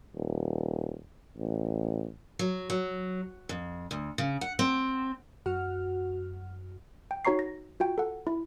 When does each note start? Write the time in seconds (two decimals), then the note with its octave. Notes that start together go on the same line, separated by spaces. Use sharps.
0.15 D#1
1.37 A1
2.39 F#3
2.70 F#3
3.49 F2
3.91 D2
4.18 C#3
4.41 F#5
4.59 C4
5.46 F#2 F#4 F#5 F6
7.11 G5
7.25 D#4 F#4 C#5 A#5 C#6 C7
7.39 A#6
7.80 F4 F#4 G5
7.98 A4 F#5
8.27 E4